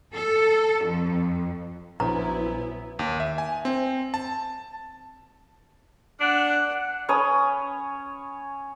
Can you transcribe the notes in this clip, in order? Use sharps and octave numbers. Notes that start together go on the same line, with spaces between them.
A4
F2
A#1 F#3 B3 C#4 E4 C5 A#5
D#2
E5
G#5
C4
A5
D4 F#5
C#4 C#5 B5 D#6